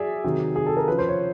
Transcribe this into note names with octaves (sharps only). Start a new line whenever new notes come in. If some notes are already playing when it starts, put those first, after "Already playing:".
Already playing: F#3 G#4 D5 E5
C3 D#3 F#3
G#4
A4
A#4
C#3 F3 B4
C5
C#5